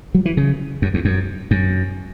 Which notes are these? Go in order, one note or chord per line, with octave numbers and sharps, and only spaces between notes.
F#3
E3
C#3
F#2
E2
F#2
F#2